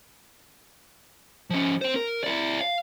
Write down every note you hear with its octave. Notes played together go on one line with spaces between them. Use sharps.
F3 C#4
C4 C5
A#4
E4 D5
F5